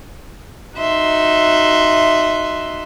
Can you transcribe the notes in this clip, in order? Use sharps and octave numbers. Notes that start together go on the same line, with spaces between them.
D#4 F#4 E5 C6